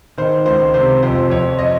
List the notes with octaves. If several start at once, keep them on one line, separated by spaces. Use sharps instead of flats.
D#3 C5
C#2 C5
C3 C5
F2 C5
F2 C#5
D#5